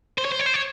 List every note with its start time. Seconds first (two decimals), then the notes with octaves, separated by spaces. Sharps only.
0.18 C5
0.25 C#5
0.32 C5
0.39 C#5
0.46 C5
0.54 C#5